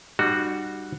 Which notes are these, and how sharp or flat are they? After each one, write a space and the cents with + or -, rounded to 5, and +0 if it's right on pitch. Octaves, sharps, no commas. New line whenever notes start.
G3 +0 D#4 -40 F#4 +0